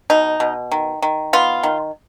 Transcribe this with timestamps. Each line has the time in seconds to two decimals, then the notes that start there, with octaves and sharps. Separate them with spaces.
0.10 B2 D#4
0.40 B2
0.72 D#3
1.02 D#3
1.33 B3 F4
1.63 D#3